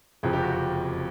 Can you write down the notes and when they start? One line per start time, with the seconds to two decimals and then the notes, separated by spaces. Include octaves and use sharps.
0.23 F#1 F2 C3 F3 G#4
0.33 G4
0.42 F#4
0.52 F#4